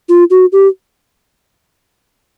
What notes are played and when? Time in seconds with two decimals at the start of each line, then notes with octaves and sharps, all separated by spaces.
0.09 F4
0.30 F#4
0.52 G4